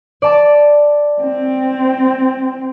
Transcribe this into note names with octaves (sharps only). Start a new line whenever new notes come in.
D5 A5 D6
C4